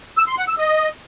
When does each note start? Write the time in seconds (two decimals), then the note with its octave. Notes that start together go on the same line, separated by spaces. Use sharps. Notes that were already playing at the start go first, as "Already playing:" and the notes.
0.17 E6
0.28 C6
0.38 F#5
0.48 E6
0.58 D#5